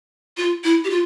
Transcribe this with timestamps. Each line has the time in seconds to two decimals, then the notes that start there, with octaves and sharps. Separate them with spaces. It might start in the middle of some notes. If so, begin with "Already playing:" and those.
0.37 F4
0.64 E4
0.84 G4
0.90 F4